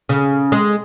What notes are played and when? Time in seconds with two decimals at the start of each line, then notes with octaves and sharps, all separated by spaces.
0.09 C#3
0.52 G#3